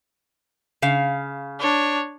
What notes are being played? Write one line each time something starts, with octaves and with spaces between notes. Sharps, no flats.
C#3 F5
D4 C#5